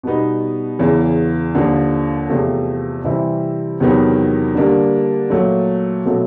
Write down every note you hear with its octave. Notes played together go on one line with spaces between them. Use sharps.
B2 G3 B3 D#4
E2 C#3 E3
D#2 D3 F3
E2 C3 F3 A3
C3 E3 G3 C4 E4
E2 C3 D#3 F#3 B3
D3 G3 A#3 D4
A#2 F#3 A3
B2 F#3 A3